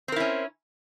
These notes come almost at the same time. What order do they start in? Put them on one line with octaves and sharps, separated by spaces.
C4 A#4 E4 C#4